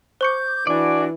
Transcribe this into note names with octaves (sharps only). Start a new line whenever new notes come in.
C5 C#6 D6 G6 C#7
E3 D4 F#4 D5 G#5